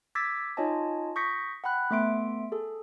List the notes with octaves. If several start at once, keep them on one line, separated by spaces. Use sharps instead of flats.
D6 E6 G#6 A6 B6
D#4 F4 C#5 D#5 G#5 A5
C#6 D#6 G6 A#6 B6 C#7
F#5 G5 B5 F#6
A3 B3 E5 C6 D7
G#4 A4